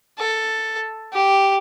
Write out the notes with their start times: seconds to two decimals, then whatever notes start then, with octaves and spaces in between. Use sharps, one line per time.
0.19 A4
1.13 G4